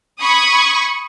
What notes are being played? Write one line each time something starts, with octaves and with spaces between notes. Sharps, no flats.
B5 C#6 D#6 G#6